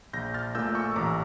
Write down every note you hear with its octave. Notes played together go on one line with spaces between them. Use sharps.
A#1 G6 A#6
F6 A6
A#2 A3 E6 G6
C#6 E6
A1 A#5 D6